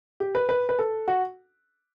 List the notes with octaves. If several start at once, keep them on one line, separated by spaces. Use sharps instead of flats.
G4
B4
B4
B4
A4
F#4